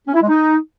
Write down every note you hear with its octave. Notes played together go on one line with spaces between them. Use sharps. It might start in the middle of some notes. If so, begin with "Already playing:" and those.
C#4
E4
G#3
D#4